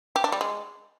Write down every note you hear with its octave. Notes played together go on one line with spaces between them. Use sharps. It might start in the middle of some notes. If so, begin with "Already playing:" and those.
G4
D4
G3
G#3